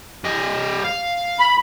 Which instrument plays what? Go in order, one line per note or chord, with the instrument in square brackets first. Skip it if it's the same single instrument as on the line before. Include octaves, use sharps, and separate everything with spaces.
[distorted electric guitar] G3 D#5
F5
[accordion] B5